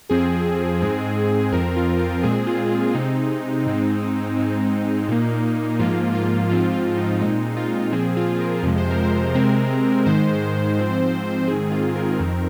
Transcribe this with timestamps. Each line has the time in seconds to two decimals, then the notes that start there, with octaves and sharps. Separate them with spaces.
0.09 F2 F3 C4 G#4
0.81 G#2 G#3 C4
1.52 F2 F3 C4 A#4
1.76 F4
1.99 F4
2.23 A#2 G#3 C4 G#4
2.47 F4
2.71 F4
2.94 C3 G#3 C4 D#4
3.66 G#2 G#3 C4
4.36 G#2 G#3 C4
5.08 A#2 A#3
5.79 G#2 F3 A#3 F4
6.15 F4
6.50 G#2 F3 C4 F4
6.74 F4
6.97 D#4
7.21 A#2 G#3 C4 D#4
7.57 F4
7.92 A#2 F3 C4 G#4
8.17 F4
8.40 A#4
8.63 F2 C3 F3 G#3
8.78 C5
8.91 A#4
9.04 C5
9.34 C3 G#3 C4 A#4
10.06 G#2 D#3 G#3 C5
10.77 G#2 F3 C4
11.47 G#2 D#3 C4 G#4
11.71 F4
11.95 A#4
12.19 F2 D#3 C4